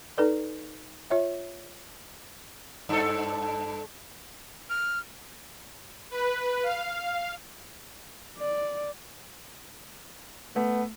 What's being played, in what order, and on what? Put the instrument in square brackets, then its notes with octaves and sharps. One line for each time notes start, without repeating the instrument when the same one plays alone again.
[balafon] D#4 A4 B4 D5
F4 C#5 E5
[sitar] G2 A4
[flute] F6
[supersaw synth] B4
F5
[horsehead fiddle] D5
[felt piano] A3 [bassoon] B3